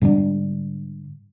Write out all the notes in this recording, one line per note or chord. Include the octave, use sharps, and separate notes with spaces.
G#2 D3 G3 D4